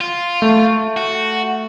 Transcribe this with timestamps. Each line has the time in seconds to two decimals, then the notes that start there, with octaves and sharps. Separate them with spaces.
0.01 F4
0.42 A3
0.97 F#4